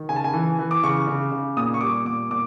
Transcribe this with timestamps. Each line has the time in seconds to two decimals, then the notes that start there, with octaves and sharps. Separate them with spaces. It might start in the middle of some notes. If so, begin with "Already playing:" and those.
Already playing: D#3
0.09 C#3 G#5
0.16 A5
0.24 G#5
0.34 E3
0.59 E3
0.71 D6
0.83 C#3 C#6
1.07 C#3
1.31 C#3
1.57 A#2 D#6
1.74 C#6
1.81 G3 D6
2.05 A#2 D6
2.30 A#2 D6